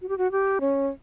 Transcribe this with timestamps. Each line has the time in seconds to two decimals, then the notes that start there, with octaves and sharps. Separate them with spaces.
0.02 F#4
0.09 G4
0.18 F#4
0.32 G4
0.61 C#4